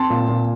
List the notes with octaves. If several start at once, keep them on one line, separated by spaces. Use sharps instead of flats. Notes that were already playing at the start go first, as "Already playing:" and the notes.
Already playing: C4 A5 C6
A#2
A#2